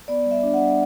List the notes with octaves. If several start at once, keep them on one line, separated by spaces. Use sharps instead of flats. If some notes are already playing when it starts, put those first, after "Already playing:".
B3 D5
G3
E5
D4
F#5
G3